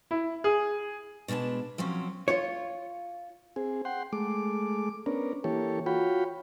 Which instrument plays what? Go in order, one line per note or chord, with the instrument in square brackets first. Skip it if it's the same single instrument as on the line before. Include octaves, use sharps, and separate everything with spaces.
[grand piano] E4
G#4
[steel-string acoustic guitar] B2 G#3 D4 B4 A5
F3 F#3 C4 C#4
[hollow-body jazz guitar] F4 C#5
[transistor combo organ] C4 G#4
F#5 G5 C6
G#3 A3 D6
B3 C#4 D4 A#4
E3 A#3 G4 A4 C#5
F4 F#4 C#5 G5 B5